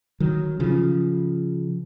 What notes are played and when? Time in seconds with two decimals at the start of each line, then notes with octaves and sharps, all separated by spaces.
0.20 D#3 F#3
0.60 C#3 F3